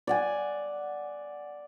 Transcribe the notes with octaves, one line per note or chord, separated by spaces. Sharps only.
D5 F#5 G#5